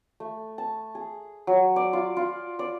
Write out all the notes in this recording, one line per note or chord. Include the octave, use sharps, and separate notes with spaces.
A3
A5
G#4
F#3
D5
F4
F4
D5